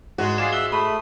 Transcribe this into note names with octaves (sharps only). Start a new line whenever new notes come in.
G#2 G#3 F#4
F4 G#4 D5 C7 E7
E5 E6 F#6 G7
A3 B5 D#6